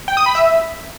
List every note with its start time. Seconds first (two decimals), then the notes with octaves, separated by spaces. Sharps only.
0.08 G5
0.17 D#6
0.26 B5
0.35 E5